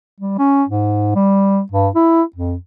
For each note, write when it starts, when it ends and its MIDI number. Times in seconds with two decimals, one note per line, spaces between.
0.21 0.36 55
0.39 0.64 61
0.69 1.15 44
1.15 1.61 55
1.72 1.88 43
1.95 2.22 64
2.36 2.56 41